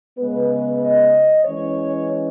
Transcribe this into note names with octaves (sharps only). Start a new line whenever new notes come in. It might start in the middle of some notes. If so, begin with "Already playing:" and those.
C#3 G#3 B3 B4
D#5
E3 G#3 C#4 C#5